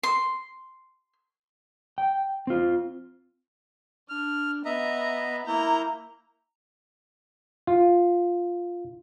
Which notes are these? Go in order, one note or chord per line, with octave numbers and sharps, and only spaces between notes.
C6
G5
C4 F4
D4 F6
B3 D#5 E5 A#5
A#3 E4 A#5 G6
F4